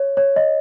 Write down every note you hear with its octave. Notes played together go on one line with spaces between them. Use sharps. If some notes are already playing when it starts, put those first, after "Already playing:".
Already playing: C#5
C#5
D#5